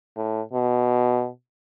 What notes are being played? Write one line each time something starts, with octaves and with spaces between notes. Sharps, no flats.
A2
B2